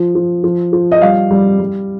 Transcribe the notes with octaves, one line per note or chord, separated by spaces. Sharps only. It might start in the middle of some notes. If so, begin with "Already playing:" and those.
Already playing: F3
F3
F3
F3
D#5
G3 F5
G3
G3